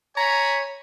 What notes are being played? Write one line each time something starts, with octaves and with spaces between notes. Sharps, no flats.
C#5 G#5 A#5 B5